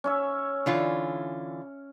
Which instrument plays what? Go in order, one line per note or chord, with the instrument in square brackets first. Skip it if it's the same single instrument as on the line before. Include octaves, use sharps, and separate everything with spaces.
[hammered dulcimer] C#4 C#5 E5
[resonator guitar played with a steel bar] D3 E3 F4